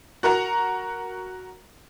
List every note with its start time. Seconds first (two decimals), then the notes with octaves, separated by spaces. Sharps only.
0.23 F#4 A#4 F#5 A#5